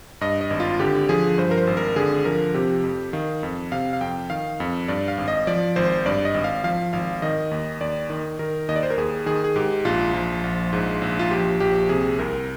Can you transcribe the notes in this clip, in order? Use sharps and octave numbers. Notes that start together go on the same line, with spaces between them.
G2 D#5
D#5
G#1
F4
D3 G4
F3 G#4
G2 C5
A#4
C5
G#1
A#4
D3 G#4
F3 A#4
C3 G4
F2
D#3 F5
F2
C3 F5
F5
F2 G5
D#3 F5
F2
G2 D5
F5
G#1
D#5
F3 D5
G#1 C5
G2 D5
D#5
G#1
F5
F3 F5
G#1 F5
D#3 D#5
D#2
D#2 D5
D#3
D#3 A#4
D#2 D#5
D5
C5
A#4
D#2 G#4
D#3 G#4
G#4
G#2 G4
A#1 F4
F3
A#1
G#2
A#1
F4
F3 G4
A#1 G4
C3 G#4
C2 A#4